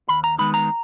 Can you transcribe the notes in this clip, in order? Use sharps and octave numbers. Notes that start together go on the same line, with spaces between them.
D#2 B5
A#5
D#3 G#3 B3 D#4 B5
A#5